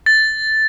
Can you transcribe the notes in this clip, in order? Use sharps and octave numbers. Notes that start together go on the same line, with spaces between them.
A6